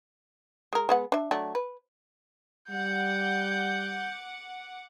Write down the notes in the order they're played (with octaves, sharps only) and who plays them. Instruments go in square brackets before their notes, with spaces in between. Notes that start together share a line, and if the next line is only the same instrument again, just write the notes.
[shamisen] G#3 A#4
G#3 B3 F#5
D4 E5
F#3 A3 D4
B4
[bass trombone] G3 [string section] F#5 D6 [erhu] G6